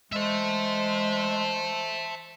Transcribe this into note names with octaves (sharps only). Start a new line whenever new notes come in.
E3 G#3 C5 E5 A5